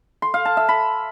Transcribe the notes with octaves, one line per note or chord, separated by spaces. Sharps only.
C6
F5
A5
E5
B5